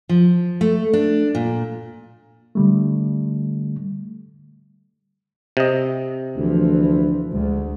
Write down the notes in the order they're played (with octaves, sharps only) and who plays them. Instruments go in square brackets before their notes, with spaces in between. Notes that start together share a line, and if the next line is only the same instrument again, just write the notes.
[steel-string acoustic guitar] F3
A3
D4
A#2
[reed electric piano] D3 G3 A3
[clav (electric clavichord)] C3 D#5
[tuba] D2 [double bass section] E3 F3
[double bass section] D2 [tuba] G#3